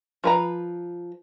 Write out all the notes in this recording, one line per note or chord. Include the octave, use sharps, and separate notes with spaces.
F3 B4 A#5